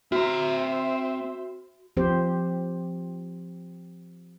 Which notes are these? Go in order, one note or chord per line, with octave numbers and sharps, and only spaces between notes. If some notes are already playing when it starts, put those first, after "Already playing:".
C4 F#4 C5 E5 A#5
F3 C4 G4 C5